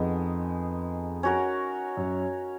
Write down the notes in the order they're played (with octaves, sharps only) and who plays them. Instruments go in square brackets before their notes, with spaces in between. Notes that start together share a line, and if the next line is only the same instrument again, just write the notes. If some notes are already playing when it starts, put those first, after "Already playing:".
Already playing: [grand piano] F2 [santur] G#3 B3 D#4
[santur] C#4 F#4 A#4
[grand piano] F#2